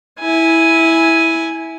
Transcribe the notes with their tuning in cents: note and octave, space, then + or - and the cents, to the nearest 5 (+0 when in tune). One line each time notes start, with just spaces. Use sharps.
E4 -10 G#5 +0